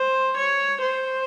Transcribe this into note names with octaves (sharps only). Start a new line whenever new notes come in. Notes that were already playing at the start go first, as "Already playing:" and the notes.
Already playing: C5
C#5
C5